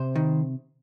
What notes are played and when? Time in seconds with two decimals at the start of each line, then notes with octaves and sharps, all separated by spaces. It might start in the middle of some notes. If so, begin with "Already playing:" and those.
Already playing: C3 C5
0.15 D#3